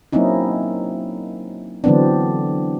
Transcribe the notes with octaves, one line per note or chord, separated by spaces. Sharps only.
F#3 A#3 C4 C#4 D#4 E4
D3 E3 F#3 B3 C4 D4